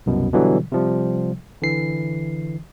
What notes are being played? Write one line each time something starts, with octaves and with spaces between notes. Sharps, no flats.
C2 F#2 B2
B2 D3 E3 F#3 G3
C3 F3 G3
D3 E3 C7